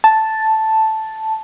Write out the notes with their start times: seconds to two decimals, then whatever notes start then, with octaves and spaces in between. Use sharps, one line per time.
0.04 A5